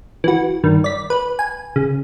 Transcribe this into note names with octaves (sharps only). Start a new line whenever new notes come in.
E3 F#4
G2 D#3
D5 B6
B4
G#5
C#3